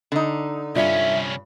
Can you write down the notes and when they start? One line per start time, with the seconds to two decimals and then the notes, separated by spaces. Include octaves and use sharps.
0.12 D3 D#4
0.76 C2 G2 C#4 F4 D5 E5